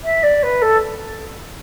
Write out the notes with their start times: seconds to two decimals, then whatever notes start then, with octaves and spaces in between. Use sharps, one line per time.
0.04 E5
0.23 D5
0.43 B4
0.62 A4